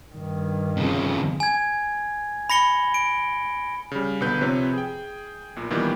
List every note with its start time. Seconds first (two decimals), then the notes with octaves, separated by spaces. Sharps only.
0.13 G2 D#3
0.77 F2 C#3
1.40 G#5 G#6
2.50 B5 A#6 C#7 G7
2.94 D7
3.91 C#3 G3
4.21 B1 B2 D3 B4 G6
4.41 C3 F3 C4 B4 C#5
4.73 G#4 G5
5.56 B1 A#2
5.70 A#2 D#3 E3 G3 B3